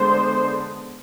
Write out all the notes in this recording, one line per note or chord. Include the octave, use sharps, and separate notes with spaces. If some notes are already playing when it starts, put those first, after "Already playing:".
Already playing: D3 G#3 B3 D4 C5